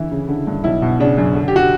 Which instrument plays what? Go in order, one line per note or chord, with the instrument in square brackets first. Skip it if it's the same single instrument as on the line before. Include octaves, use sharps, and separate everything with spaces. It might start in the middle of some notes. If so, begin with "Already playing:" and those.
Already playing: [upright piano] D3 E3 E4
C#3
D3
G2
B1 E4
B2
C#3 D4
F#2
D3
G4
F#4